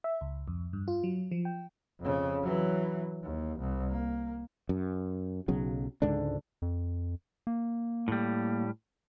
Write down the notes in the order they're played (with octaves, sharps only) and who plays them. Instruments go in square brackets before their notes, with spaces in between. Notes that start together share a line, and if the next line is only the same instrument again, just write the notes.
[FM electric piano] E5
C#2
F2
G2
F4
F#3
F3
G5
[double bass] F2 C#3
E3 F#3
D#2
C2
A#3
[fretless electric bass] F#2
B1 C#3 F#3
C#2 G#2 D3 D4
[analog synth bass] F2
A#3
[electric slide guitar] A2 G3